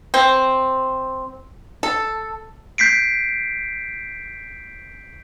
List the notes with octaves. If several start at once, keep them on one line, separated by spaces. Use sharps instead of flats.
C4
A4
G6 B6 C7 D7